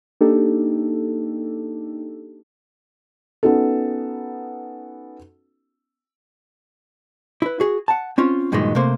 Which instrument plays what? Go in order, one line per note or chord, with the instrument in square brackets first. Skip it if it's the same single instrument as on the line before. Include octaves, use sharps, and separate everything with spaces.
[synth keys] A#3 D4 D#4 G4 A4
[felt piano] B3 C#4 D#4 F#4 A4
[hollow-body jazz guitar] E4 B4
F#4 G#4
F#5 A5
C4 C#4 F4
G2 A#2 D#3 E3 F#3 G#3
C3 A3 A#3 C5